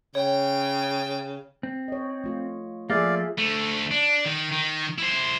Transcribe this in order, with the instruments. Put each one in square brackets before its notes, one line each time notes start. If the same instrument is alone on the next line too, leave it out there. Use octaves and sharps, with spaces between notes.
[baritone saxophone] C#3 [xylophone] C#5 [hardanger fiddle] G5
[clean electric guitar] C4
[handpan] C#5 D#5
A3 F4
[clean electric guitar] F3 A3 A#3 [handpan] F4 G#4 E5 [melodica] D5 F5
[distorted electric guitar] D2 A3
D4
D#3
D#3
E4 C5